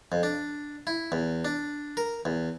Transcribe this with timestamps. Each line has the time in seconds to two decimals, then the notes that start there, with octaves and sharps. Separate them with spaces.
0.12 F2
0.23 D4
0.87 E4
1.12 E2
1.45 D4
1.97 A#4
2.25 E2